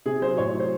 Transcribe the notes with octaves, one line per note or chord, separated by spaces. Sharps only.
C3 G#4
F#3 C5
A2 C#5
F#3 C#5
C5